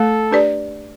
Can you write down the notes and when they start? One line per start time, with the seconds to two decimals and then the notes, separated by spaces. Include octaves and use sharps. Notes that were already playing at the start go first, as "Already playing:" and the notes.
Already playing: A3 A4
0.31 D4 G4 B4 D5